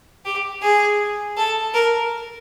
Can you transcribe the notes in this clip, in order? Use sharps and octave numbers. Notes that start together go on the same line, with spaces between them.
G4
G#4
A4
A#4